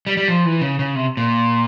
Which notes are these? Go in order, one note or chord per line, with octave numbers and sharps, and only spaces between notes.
G3
G3
F3
E3
C#3
C#3
C3
A#2